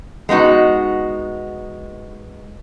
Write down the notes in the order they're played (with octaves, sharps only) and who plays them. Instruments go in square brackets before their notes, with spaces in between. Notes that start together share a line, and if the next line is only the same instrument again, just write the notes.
[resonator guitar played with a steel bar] G#3 B3 D#4 F#4